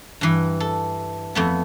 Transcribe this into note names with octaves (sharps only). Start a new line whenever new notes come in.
G2 E3
A4
F2 A3 B3